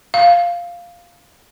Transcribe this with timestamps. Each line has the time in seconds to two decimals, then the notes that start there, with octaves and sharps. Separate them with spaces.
0.14 F5